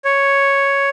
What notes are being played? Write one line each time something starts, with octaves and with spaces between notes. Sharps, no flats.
C#5